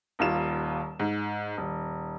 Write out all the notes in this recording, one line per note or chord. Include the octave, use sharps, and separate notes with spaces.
D#1 D#2 F4 E7
G#2
D#1